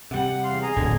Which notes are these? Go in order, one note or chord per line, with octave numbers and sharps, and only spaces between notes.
C3 G3 F#5
E2 F5 C6
G#4 G#5 A#5
D1 B2 D3 G#6